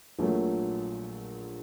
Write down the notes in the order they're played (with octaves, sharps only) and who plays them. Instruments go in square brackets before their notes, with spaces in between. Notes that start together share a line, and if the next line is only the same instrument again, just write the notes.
[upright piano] A#1 A#2 F#3 A3